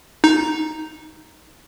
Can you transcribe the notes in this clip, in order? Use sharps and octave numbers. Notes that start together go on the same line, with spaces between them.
D#4